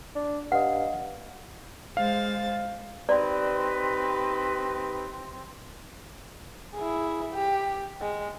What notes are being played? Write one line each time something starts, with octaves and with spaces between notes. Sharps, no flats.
D4
G2 D#5 F5 F#5
G#3 C5 F5 A6
C4 D#4 G4 B4 D5
E4 G#4
G4
G#3